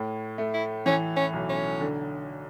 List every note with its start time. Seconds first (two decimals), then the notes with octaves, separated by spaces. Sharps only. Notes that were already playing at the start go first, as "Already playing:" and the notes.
Already playing: A2
0.38 A3
0.54 E4
0.86 E3 C#4
1.17 C#4
1.33 B1
1.49 C#4
1.81 D3